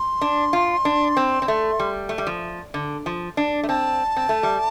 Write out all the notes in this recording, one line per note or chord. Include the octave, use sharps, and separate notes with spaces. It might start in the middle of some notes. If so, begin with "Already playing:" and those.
Already playing: C6
D4
F4
D4
C4
C4
A3
G3
A3
G3
F3
D3
F3
D4
A3
C4 A5
C4
A3
G3